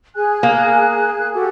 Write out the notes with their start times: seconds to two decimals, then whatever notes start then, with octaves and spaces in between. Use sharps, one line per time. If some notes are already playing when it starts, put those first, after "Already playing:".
0.16 G#4 G#5 F#6
0.43 A#3
1.34 F#4 G4 A4